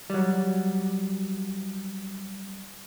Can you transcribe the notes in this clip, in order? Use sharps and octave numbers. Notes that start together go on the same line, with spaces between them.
F#3 G3